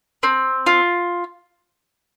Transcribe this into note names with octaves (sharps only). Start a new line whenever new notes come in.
C4
F4